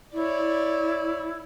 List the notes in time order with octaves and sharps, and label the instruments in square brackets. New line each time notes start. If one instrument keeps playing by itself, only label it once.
[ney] E4 [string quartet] C#5 D5